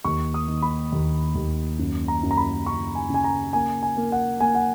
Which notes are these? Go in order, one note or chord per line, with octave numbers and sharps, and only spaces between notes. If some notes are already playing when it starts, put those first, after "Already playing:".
D#2 C#6
D#6
D#3
B5
D#2
D#2
F#2
A#5
F#2
A#5
B5
C#3 C#6
G#5
C#3 G#5
A#5
A#3 G#5
G#5
A#3
F#5
A#3 G#5
F#5